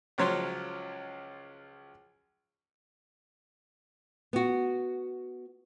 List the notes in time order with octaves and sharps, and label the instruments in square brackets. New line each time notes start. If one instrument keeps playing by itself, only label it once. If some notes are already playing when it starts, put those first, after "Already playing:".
[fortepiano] C#2 F3 F#3 C#5 C6
[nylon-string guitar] B3 F#4